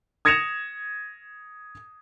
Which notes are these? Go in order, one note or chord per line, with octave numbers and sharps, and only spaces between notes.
D#6 G#6 A#6 C#7 E7 F7